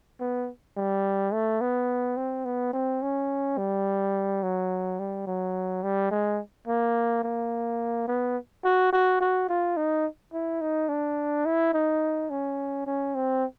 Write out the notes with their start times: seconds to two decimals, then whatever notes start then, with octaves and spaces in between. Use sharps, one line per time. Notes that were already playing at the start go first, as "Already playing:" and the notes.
0.20 B3
0.77 G3
1.33 A3
1.61 B3
2.17 C4
2.46 B3
2.73 C4
3.02 C#4
3.58 G3
4.43 F#3
4.99 G3
5.27 F#3
5.83 G3
6.11 G#3
6.68 A#3
7.24 A#3
8.08 B3
8.64 F#4
8.93 F#4
9.21 F#4
9.49 F4
9.77 D#4
10.33 E4
10.61 D#4
10.89 D4
11.46 E4
11.74 D#4
12.30 C#4
12.87 C#4
13.15 C4